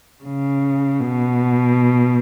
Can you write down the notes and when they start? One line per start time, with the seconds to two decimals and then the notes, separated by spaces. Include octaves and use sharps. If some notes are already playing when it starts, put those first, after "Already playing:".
0.24 C#3
1.00 B2